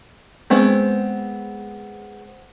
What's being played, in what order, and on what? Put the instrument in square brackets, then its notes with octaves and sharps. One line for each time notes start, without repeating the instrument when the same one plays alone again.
[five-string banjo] G#3 B3 C4 B4